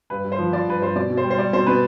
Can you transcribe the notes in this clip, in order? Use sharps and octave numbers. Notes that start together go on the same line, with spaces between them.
G2 B4
G2
C5
F3
F3 D5
G2 B4
G2 C5
B2 D5
B2
C5
G3
C5
G3 D5
B2 C5
B2 B4